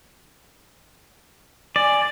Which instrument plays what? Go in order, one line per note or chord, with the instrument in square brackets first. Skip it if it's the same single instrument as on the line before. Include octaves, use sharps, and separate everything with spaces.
[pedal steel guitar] D5 [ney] G#5